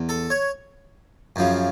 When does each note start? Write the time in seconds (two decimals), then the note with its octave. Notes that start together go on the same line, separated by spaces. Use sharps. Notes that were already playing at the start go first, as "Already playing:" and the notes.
Already playing: E2
0.09 A4
0.30 C#5
1.36 F#2 C#3 F3